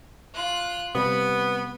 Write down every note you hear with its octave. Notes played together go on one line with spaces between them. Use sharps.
F4 F#6
C3 G3 B3 B5